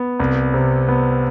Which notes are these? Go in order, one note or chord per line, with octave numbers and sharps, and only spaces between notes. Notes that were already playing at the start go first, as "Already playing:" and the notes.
Already playing: B3
C2
C3
B3